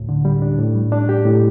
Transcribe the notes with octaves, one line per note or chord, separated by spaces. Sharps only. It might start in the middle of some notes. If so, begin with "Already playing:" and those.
Already playing: D2 A2
D3
G3
D4
A2
G3
D4
G4
A2